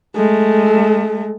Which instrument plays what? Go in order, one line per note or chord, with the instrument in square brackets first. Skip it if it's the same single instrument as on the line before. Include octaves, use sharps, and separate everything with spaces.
[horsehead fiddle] G#3 A3